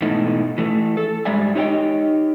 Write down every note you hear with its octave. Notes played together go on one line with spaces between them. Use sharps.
G#2 B2 E3 A3 D#4
E3 A3
A4
G#2 G3 G#3 D5 E5 G#5
D#4 G4 C#5 D#5 F#5 G5